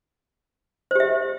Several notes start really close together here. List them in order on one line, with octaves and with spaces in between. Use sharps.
C5 G4 E5